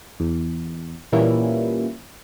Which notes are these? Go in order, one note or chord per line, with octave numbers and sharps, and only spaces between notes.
E2
A#2 E3 G3 A#3 C#4 E4